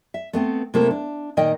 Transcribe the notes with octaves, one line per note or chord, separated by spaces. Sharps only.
E5
A3 B3 C4
C3 A3 A#3 E4 A4
D4
A#2 D#3 A#4 D#5 G5